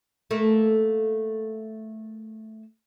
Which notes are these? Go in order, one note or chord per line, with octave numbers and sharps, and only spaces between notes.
A3 A#3